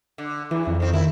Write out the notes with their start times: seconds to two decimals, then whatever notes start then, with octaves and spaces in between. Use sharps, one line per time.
0.18 D3
0.51 E2 E3
0.67 F2
0.80 D#3 C4
0.93 D#3 E4